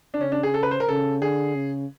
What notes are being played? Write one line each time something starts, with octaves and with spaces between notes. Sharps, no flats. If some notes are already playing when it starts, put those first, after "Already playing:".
D4
C#3 C#4
D4
G#4
A4
B4
C5
A#4
C#3 A4
D3 G#4
C#3